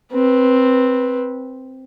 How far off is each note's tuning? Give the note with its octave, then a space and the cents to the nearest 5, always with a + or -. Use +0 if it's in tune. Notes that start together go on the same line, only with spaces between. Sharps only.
C4 +0 B4 -15